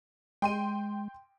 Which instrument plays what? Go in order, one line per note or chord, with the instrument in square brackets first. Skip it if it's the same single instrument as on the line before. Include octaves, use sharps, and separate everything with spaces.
[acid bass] G#3 [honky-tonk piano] G5 C6 D#7